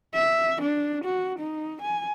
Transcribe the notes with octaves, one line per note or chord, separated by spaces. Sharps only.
E5
D4
F#4
D#4
G#5